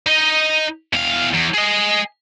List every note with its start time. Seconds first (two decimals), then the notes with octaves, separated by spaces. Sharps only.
0.07 D#4 D#5
0.93 E2 F5
1.33 E2
1.54 G#4 D#5